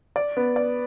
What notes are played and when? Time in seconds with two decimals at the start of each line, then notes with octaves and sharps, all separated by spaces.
0.16 D5
0.37 B3
0.56 D5